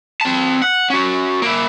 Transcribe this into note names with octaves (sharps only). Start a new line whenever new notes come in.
C4 A5
F#5
C#4 F#4
A#3 E4